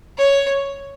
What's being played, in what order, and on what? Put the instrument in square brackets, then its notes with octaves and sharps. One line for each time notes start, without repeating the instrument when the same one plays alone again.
[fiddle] C#5